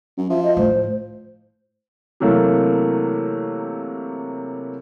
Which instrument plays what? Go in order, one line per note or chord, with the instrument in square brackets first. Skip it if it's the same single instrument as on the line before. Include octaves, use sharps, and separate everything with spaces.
[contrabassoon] F#2
[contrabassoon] F3 [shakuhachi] E5
[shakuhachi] D#5
[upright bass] A2 [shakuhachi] C5
[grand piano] C3 E3 F#3 A3 A#3